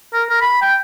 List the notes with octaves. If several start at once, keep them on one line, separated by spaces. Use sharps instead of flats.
A#4
A#4
B5
G5